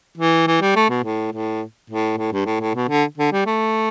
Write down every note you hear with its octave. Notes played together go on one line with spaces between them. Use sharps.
E3
E3
G3
A3
B2
A2
A2
A2
A2
G2
A2
A2
B2
D3
D3
G3
A3